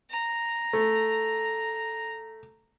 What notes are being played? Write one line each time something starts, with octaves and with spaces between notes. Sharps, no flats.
A#5
A3